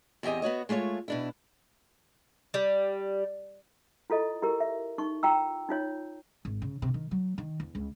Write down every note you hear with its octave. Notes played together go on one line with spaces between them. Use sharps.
E2 C4 G4 D#5 G#5
B3 F#4 C#5 D#5
G#3 A3 F4 C#5
B2 D4 E4
G3
E4 F4 A4 D#5
E4 G4 A#4
E5
D#4 C#6
F4 G5 A#5 E6
D#4 F4 C#5
G#1
C#3
C3
D#3
F#3
D#3
E2
C#2